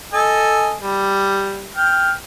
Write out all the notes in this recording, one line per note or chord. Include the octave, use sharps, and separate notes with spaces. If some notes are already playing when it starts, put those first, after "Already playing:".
A4 D#5 G#5
G3
G5 F6